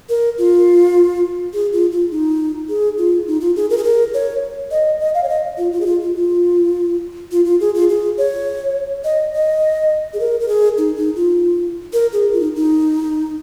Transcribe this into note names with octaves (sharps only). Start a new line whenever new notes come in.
A#4
F4
G#4
F4
F4
D#4
G#4
F4
D#4
F4
G#4
A#4
G#4
A#4
C#5
D#5
D#5
F5
C#5
D#5
F4
F4
G#4
F4
F4
F4
F4
F4
G#4
F4
G#4
C#5
D#5
D#5
G#4
A#4
A#4
G#4
D#4
D#4
F4
A#4
G#4
F4
D#4
D#4